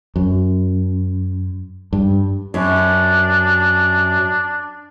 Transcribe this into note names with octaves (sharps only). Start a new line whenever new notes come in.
F#2
G2
F#2 D4